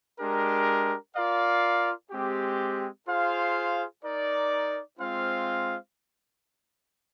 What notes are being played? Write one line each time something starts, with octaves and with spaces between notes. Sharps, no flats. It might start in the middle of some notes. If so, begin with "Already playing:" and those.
G#3 D4 G4 A#4
F4 A#4 D5 F5
G#3 C4 G4
F4 G#4 C5 F5
D#4 A#4 D5
G#3 C4 F4 C5 F5